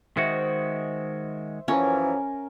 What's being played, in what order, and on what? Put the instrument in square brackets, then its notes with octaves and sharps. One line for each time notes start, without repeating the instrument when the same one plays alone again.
[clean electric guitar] D#3 G#3 F#4 [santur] C5 E5
[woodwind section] F#2 E3 F3 [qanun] C#4 [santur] A#4 G#5